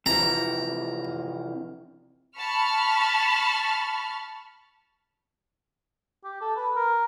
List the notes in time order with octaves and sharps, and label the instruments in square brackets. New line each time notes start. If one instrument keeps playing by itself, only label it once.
[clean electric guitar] C3 E3 F3 [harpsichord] A#5
[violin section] A5 B5 C#6 F6
[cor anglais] G4
A4
B4
A#4